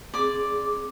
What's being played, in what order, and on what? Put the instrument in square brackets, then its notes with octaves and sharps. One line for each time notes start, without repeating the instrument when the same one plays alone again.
[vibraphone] C4 G#4 [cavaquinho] D5 D6